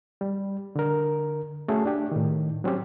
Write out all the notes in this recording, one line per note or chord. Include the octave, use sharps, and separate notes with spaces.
G3
D3 A#4
A3 C#4 F#4 G#4 A4
D4 G4
A2 D#3
F#3 C4 C#4 G4